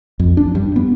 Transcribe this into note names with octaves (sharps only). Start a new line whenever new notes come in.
F2
D4
G2
B3